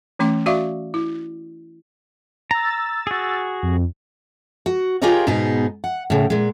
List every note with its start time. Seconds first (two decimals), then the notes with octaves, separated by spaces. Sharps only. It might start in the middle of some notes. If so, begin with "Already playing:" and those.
0.19 E3 A3 C#4 C6 D6
0.46 F#4 D5 E5 F5 C#6 D6
0.94 E4
2.51 A#5 E6 A6
3.07 F#4 G#4
3.63 F2
4.66 F#4
5.02 F4 G4 G#4 A#4 C#5 D#5
5.27 G#2 B2 B3 D#4 G#4
5.84 F#5
6.10 A2 C#3
6.30 A#2 G#3